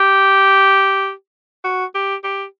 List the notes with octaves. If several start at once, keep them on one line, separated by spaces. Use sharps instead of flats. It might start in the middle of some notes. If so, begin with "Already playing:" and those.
Already playing: G4
F#4
G4
G4